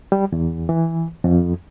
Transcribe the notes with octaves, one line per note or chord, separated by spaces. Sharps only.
G3
E2
E3
F2